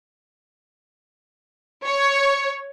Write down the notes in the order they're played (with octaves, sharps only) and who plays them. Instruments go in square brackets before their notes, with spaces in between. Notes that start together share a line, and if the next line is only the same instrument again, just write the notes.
[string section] C#5